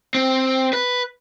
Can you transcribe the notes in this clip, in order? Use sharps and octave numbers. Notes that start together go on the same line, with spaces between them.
C4
B4